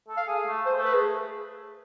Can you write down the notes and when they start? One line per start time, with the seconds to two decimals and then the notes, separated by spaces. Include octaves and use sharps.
0.08 A4
0.17 F5
0.27 G#4
0.47 A3
0.66 C5
0.75 A3
0.85 B4
0.94 G#4